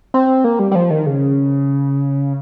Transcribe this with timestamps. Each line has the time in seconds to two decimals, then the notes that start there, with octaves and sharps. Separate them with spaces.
0.14 C4
0.44 A#3
0.59 G3
0.71 G3
0.75 F3
0.90 D#3
1.06 C#3